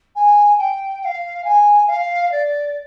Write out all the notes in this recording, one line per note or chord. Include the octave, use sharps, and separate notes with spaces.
G#5
G5
G5
F5
G#5
F5
D5